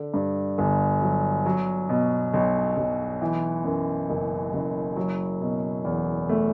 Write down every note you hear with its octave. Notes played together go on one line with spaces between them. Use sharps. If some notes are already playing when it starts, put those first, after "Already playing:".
Already playing: D3
G2
G1
F#3
F#3
B2
B1
B1
E3
F#2
F#1
F#1
F#3
B2
E2
A3